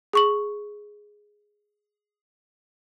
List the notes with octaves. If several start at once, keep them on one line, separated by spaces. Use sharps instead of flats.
G#4 C#6 F#7